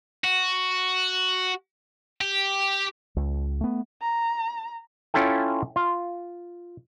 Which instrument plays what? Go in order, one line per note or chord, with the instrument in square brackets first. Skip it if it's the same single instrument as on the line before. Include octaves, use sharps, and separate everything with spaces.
[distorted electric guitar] F#4
G4
[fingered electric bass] C#2
A3 B3
[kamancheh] A#5
[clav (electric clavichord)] C#4 E4 F4 A4 G5
F4